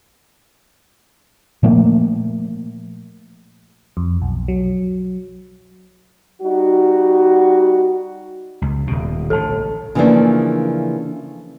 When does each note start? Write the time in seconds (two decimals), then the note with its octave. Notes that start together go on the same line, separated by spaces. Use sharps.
1.63 A#2 F3 A3 A#3
3.97 F2
4.22 B1
4.48 F#3
6.41 G3 D#4 F#4
8.62 C#2
8.87 D#1 B2
9.30 A1 D3 A4 A5
9.95 C#3 E3 F3 A3 A#3 D4